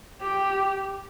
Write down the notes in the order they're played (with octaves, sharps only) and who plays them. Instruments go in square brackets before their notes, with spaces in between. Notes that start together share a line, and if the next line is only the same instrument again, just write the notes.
[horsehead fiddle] G4